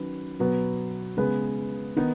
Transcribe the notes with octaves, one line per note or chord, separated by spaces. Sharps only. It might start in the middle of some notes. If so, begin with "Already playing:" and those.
Already playing: D#3 F#3 C#4 B4
B2 F#3 B3 F#4 B4
C#3 G#3 B3 G#4 B4
D#3 B3 D#4